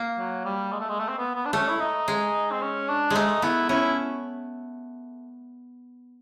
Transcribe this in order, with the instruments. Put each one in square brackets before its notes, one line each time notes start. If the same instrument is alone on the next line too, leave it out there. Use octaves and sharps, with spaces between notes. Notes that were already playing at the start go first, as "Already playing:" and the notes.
Already playing: [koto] A#3
[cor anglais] F#3
G3
G#3
A3
G#3
A3
C4
B3
B3
D4
[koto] A3 [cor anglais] C#4
[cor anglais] E4
D#4
[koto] G#3
[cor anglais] C4
C#4
D4
[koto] G#3
[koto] A3 [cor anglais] D#4
[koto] B3 [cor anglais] E4
[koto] C#4 [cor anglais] E4